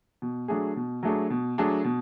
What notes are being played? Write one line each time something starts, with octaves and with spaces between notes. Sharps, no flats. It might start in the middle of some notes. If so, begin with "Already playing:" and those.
B2
F#3 A3 D4 G#4
B2
F#3 A3 D4 G#4
B2
F#3 A3 D4 G#4
B2